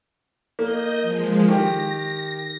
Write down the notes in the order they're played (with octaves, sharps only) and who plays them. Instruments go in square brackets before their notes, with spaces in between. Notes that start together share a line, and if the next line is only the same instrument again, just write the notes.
[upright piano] A#3 [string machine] D#5 G6
[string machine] F3 G#3
[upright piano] D#3 G4 [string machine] A#6